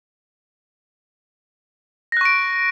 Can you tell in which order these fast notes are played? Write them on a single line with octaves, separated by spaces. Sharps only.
A#6 F#6 C#6 D7